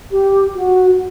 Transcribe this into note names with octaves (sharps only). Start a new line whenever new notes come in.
G4
F#4